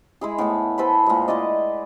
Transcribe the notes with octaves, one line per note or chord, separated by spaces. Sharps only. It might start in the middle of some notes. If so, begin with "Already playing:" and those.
G#3 E4 G#4
A2 B3 F#5
A4 B4 C5 B5
A#2 G#3
E4 B4 D5 D#5